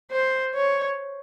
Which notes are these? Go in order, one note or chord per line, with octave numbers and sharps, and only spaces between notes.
C5
C#5